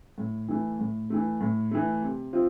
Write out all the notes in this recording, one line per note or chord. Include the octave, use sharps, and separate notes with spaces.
A2
E3 A3
A2
E3 A3
A2
E3 A3
C3
F3 C4 F4